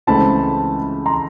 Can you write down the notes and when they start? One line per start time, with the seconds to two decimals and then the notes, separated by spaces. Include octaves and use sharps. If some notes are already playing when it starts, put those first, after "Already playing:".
0.07 C#2 C#3 E3 A3 C4 A5 B5
1.06 A#5 C6